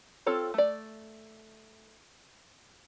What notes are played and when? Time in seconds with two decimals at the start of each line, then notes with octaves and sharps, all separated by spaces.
0.26 C4 F4 A4 C#5
0.54 A3 D5